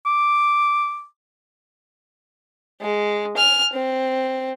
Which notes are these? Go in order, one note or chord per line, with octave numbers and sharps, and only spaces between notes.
D6
G#3
G#5 F6
C4